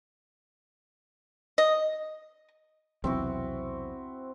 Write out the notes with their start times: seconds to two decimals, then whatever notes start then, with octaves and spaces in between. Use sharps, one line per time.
1.58 D#5
3.04 B1 E2 C3 C4 E4 F#4